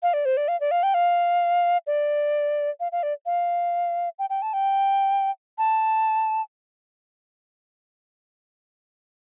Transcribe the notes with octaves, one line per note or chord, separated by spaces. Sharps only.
F5
D5
C5
D5
F5
D5
F5
G5
F5
D5
F5
F5
D5
F5
G5
G5
A5
G5
A5